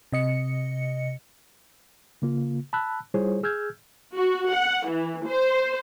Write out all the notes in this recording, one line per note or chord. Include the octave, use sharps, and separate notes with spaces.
C3 D#5 C#7
C#3 A#3 F4
A5 B5 E6 F#6
G3 E4 F4 G#4 C5 C#5
G#4 E6 F6 G6 G#6
F#4
F#5
E3
C5